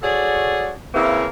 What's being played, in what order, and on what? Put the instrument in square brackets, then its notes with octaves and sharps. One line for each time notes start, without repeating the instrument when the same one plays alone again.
[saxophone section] F#4 G#4 A4 C#5 D5
C#3 E3 A#3 C4 E4